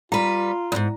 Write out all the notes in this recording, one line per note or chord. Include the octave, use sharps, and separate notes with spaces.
G3 F4 B4 A#5
E2 G#2